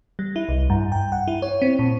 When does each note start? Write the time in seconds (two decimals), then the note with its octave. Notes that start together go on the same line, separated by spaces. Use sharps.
0.19 G3
0.36 E4
0.49 C2
0.70 G2
0.92 G5
1.12 F#5
1.28 E4
1.42 C#5
1.62 C4
1.79 A#2